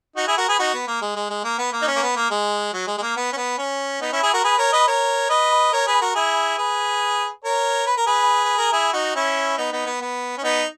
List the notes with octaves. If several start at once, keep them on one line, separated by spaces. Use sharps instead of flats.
D#4 F#4
E4 G#4
F#4 A#4
G#4 B4
D#4 F#4
B3
A#3
G#3
G#3
G#3
A#3
B3
A#3
D#4
C#4
A#3
B3
A#3
G#3
F#3
G#3
G#3
A#3
B3
C#4
B3
C#4
B3 D#4
C#4 E4
E4 G#4
F#4 A#4
G#4 B4
A#4 C#5
B4 D#5
A#4 C#5
B4 D#5
A#4 C#5
G#4 B4
F#4 A#4
E4 G#4
G#4 B4
A#4 C#5
B4
A#4
G#4 B4
B4
A#4
E4 G#4
D#4 F#4
C#4 E4
B3 D#4
B3 D#4
B3
B3
C#4
B3 D#4